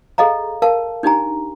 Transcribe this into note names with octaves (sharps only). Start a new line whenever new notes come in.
G#4 A4 D#5 F5 A#5
A#4 F5 A5
D4 D#4 G4 G#5 A#5